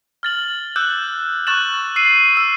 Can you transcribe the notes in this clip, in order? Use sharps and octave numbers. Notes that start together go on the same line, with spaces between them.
F6 A6 F#7
D6 E6 F#6 G6 A6
C#6 F#6 A6 E7 F#7
E6 C7 D#7
E6